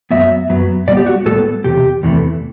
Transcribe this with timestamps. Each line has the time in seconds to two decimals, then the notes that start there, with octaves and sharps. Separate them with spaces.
0.11 F#2 F#3 B3 E5
0.49 F#2 F#3 B3
0.88 A2 G3 B3 D5
0.97 G4
1.06 F#4
1.26 A2 G3 B3 A4
1.64 E2 C3 G4
2.03 E2 C3 E3 A3